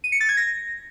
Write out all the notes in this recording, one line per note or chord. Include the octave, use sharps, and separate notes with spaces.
D#7
C#7
A6
G#6
A#6